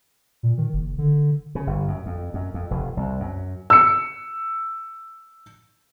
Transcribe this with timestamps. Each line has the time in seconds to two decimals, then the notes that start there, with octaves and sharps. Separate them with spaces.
0.43 A#2
0.58 D#3
0.73 F#1
0.98 D3
1.55 C#3
1.67 G1
1.88 F#2
2.06 F2
2.34 F#2
2.54 F2
2.71 F1
2.97 C2
3.20 F#2
3.70 E6 C#7